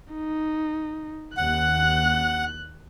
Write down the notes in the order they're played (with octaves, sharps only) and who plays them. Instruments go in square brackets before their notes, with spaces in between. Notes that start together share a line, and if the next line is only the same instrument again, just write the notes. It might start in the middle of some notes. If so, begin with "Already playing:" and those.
[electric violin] D#4
[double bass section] D#2 [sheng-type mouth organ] F#5 [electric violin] F#6